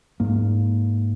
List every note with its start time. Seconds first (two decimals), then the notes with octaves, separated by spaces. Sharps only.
0.20 G#2 A#3